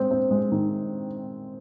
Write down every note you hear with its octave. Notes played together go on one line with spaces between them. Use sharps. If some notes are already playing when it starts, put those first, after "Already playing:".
Already playing: G#3 C4
C4
G#3
D#3